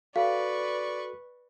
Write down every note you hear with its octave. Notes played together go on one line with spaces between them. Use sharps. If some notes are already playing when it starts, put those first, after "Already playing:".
F#4 A4 B4 D5 F5 C#6